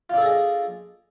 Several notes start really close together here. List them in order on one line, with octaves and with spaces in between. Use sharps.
F4 D4 A4 G#4 D#5